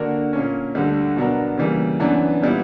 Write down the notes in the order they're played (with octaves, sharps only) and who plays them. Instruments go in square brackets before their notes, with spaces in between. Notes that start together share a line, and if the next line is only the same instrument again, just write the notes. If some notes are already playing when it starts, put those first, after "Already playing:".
Already playing: [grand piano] D3 A#3 D4 F#4 A#4
A#2 A#3 C#4
D2 D3 G3
B2 F#3 B3 D4 A#4
C#3 E3 G3 A#3
F#2 E3 B3 D4
A#2 G3 B3 E4